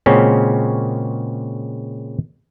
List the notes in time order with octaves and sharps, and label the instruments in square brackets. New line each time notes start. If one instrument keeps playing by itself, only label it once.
[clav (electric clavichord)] A#2 C#3 G#3 C4 C#4 F#4